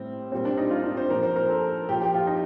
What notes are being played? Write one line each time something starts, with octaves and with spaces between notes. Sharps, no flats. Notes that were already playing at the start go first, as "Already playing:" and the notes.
Already playing: A2 G3 C4
A#2 G3 C4
D4
D#4
F4
D4
C5
A#2 F3 A#4
C5
A#4
A4
A#2 F3 G4
G4
F4
D#4